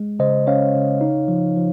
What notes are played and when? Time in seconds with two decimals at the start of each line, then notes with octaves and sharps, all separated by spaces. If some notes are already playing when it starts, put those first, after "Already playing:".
Already playing: G#3
0.19 C#3 C5 D#5
0.47 C#4 C#5 F5
0.75 C#3
1.01 D#4
1.28 F3
1.56 F3